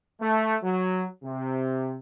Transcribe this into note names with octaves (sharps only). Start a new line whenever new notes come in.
A3
F#3
C3